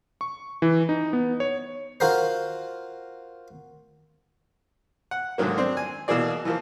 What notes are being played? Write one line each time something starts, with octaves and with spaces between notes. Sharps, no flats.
C#6
E3
D#4
B3
C#5
F4 F#4 A#4 C5
F#5
G#2 D3 D#3 F#3 A#3
C4 D4 C5
G#5
B2 E3 A#3 G#4 D5
E3 F3 A#3